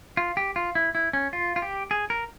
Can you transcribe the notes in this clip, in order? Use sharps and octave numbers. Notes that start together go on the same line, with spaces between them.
F4
G4
F4
E4
E4
C#4
F4
F4
G4
G#4
A#4